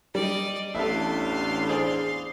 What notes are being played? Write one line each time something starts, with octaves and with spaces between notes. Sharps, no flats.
G3 D5 D#5
A1 E2 A2 D4 A4 E5 F5 C6
G#4 C5 D5